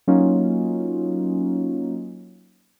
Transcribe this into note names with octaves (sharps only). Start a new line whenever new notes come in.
F#3 A#3 C#4 D#4 F4